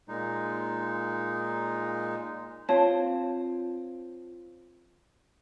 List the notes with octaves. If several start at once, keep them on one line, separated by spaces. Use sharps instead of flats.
A#2 G#3 D#4
C4 F4 C#5 A5